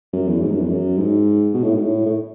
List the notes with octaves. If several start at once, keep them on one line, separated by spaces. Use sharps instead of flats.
F#2
E2
G#2
F#2
E2
F#2
G#2
B2
A2
G#2
A2
A2